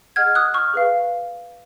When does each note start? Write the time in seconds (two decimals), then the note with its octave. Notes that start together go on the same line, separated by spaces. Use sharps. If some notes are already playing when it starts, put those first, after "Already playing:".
0.16 G#4 D#5 F#5 F6 G#6
0.35 D#6 F#6
0.54 C#6 F6
0.74 G#4 B4 F5